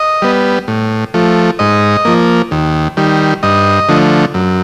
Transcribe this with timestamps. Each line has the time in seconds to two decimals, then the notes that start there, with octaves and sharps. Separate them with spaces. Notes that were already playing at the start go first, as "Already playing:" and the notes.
Already playing: D#5
0.22 G3 B3
0.68 A2
1.14 F3 A3
1.59 G#2 D#5
2.05 F3 A#3
2.51 D#2
2.97 D#3 G3
3.43 G2 D#5
3.89 D3 F3 A3
4.34 F#2